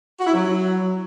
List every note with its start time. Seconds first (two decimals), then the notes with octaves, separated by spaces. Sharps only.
0.20 F#4
0.27 E4
0.33 F#3